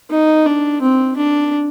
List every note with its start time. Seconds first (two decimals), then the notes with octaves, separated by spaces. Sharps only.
0.11 D#4
0.46 D4
0.82 C4
1.17 D4